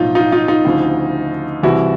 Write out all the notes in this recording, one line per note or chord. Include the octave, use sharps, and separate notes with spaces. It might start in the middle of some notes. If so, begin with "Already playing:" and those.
Already playing: B1 A2 F3 D#4 F4
D#4 F4
D#4 F4
D#4 F4
D2 C#3 F3
C2 C3 E3 E4 F#4